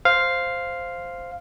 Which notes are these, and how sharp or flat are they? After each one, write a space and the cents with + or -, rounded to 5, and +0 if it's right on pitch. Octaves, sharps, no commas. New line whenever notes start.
C5 +0 F5 +0